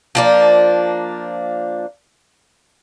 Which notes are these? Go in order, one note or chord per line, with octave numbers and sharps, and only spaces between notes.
F3 A#3 D4